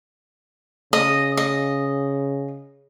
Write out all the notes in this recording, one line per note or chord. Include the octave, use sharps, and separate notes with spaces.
C#3 D#5
D#5